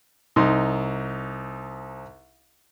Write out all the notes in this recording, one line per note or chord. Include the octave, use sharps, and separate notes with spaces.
C2 D#4 C6